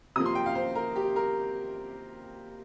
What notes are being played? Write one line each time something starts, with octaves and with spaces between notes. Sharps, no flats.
C3 F3 A#3 D#6
C6
G5
F5
C5
A#4
G4
A#4